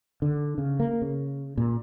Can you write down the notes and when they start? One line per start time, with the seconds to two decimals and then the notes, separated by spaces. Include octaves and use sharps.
0.22 D3
0.58 C#3
0.80 A#3
1.02 C#3
1.57 A#2